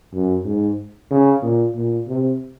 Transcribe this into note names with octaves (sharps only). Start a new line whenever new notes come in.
F#2
G#2
C#3
A#2
A#2
C3